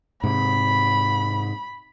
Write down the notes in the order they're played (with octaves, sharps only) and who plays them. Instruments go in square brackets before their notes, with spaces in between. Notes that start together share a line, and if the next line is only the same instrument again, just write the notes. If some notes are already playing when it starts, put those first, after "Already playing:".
[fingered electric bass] G#2 C3 [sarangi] B5